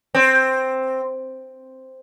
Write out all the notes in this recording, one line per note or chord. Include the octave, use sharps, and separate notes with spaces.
C4